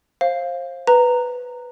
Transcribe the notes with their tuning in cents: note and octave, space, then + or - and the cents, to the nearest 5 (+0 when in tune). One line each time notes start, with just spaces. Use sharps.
C5 +30 F5 +0
B4 +0 A#5 -10